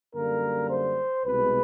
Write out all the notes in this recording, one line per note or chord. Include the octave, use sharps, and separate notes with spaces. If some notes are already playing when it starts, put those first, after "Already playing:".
F#2 D3 G3 A#3 A#4
C5
C2 B2 G#3 B4